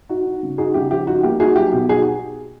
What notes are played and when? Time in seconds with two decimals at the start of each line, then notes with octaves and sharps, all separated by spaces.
0.09 D#4 F#4
0.25 D#4
0.43 C#3
0.58 D#4 F#4 G#4
0.74 C#3 G4
0.91 F3 G4
1.07 D#4 F#4
1.23 A#3 G4
1.40 D#4 F#4 G#4
1.56 F#3 G4
1.72 B2 G4
1.89 D#4 F#4 G#4